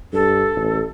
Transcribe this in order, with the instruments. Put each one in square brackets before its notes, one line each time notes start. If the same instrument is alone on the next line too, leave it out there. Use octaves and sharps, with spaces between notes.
[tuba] G2 [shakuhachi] A4
[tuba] A1